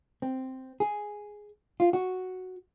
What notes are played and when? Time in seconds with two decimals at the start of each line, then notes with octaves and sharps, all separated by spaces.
0.22 C4
0.80 G#4
1.80 F4
1.93 F#4